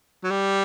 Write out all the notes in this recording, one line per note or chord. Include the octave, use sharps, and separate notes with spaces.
F#3
G3